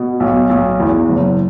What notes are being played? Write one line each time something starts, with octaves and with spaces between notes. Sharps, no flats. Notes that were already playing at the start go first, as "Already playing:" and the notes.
Already playing: B2
B1
B1
E2
F#1